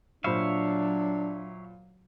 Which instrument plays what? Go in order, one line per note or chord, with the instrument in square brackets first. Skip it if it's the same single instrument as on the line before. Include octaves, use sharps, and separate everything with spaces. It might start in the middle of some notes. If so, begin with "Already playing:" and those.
[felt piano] A#2 C5 B5 [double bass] F#3 [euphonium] D4 [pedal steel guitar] C#5 E5 F5